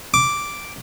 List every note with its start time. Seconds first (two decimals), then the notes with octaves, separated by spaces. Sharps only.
0.14 D6